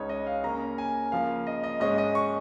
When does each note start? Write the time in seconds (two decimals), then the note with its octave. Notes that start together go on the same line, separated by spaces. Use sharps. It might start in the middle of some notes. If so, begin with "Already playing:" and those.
Already playing: C#2 C#3 G#3 D#4 C#5
0.09 D#5
0.27 F5
0.44 C#3 A#3 C#4 A#5
0.78 G#5
1.12 C#3 F3 A#3 F5
1.47 D#5
1.64 D#5
1.80 G#2 G#3 C#4 D#5
1.98 D#5
2.15 C#6